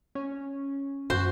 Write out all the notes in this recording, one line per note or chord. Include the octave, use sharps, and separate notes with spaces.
C#4
F#2 F#4 C5